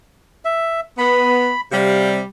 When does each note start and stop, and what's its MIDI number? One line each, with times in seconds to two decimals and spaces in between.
0.45 0.80 76
0.98 1.50 59
0.98 1.61 83
1.72 2.22 48
1.72 2.22 55
1.72 2.09 77